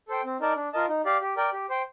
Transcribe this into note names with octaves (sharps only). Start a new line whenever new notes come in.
A4 C5 G5
C4
D#4 A#4 D5 A5
D4
F4 A#4 D#5 A5
D#4
G4 D5 F5
G4
A#4 D5 G5
G4
C5 G5